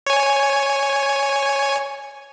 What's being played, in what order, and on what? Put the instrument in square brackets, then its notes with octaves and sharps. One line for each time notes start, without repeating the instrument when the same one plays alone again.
[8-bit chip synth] C#5 G#5